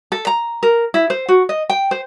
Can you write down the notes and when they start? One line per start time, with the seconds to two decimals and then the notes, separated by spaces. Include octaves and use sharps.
0.12 A4
0.27 A#5
0.63 A#4
0.94 E4
1.10 C5
1.28 F#4
1.49 D#5
1.70 G5
1.91 C5